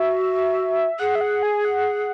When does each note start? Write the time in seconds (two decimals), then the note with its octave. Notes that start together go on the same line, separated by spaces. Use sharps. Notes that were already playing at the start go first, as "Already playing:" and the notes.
Already playing: F#4 E5
0.99 G#4 F#5
1.15 E5
1.21 F#5
1.43 G#5
1.65 F#5